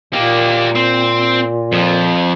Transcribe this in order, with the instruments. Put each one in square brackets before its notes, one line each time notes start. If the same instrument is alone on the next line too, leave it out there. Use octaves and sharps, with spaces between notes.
[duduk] A#2 [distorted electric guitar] A#3 G4
[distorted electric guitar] C4 C5
F2 F3